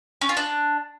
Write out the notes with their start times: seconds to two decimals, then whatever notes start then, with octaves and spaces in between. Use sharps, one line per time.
0.21 C#4
0.29 F4
0.37 D4